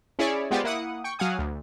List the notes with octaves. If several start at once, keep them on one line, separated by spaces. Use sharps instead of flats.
C#4 E4 G#4 C#5 D5
G#3 B3 F4 G4 C5 D5
A#3 E4 F#5 D#6
G5 C#6
F#3 F5 F#5 G#5 D#6
D2